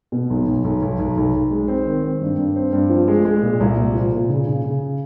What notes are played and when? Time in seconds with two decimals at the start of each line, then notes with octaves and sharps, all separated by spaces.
0.12 B2
0.30 B1
0.47 B1
0.64 B1
0.82 B1
0.99 B1
1.17 B1
1.33 B1
1.51 G#3
1.68 C4
1.86 D#3
2.03 C4
2.21 G2
2.38 G2
2.56 C4
2.73 G2
2.90 F3
3.08 G#3
3.25 G#3
3.42 A#2
3.60 C2
3.77 A#2
3.94 F3
4.12 A#2
4.29 C#3
4.47 C#3
4.64 C#3